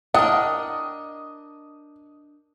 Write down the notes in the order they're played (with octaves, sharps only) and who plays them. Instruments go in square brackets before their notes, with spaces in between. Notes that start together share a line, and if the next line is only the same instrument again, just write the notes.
[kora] D4 A#4 [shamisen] E4 F#5 G5 [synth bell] D#5 [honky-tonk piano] D#6